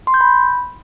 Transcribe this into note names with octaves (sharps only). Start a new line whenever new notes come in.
C6
G6
B5